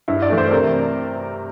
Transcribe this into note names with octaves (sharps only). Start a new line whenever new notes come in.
G2 E4
D5
E3 A3
C5
C3 A#4